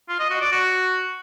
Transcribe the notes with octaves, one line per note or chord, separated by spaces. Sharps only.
F4
D#5
F#4
D5
F#4